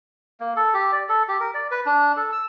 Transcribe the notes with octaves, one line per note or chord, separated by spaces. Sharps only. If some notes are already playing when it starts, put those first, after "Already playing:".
A#3
A4
G4
D5
A4
G4
A#4
D5
B4
D4
A4
E6